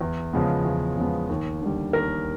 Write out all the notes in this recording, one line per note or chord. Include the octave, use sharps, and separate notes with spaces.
E2
C#3 F3 G#3 B3
E2
C#3 F3 G#3 B3
D#2
D3 G3
D#2 A#4